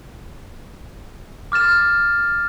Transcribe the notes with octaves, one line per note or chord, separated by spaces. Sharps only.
D6 F6 A6 E7